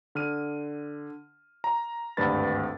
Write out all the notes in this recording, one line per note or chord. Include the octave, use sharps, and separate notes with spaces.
D3 F6 D#7
A#5
G#1 D2 G2 B4 B5 A6